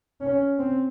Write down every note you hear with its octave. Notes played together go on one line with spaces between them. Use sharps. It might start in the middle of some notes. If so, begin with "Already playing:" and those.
C#4
C4